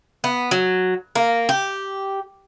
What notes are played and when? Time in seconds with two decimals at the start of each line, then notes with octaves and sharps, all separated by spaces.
0.24 B3
0.51 F#3
1.15 A#3
1.49 G4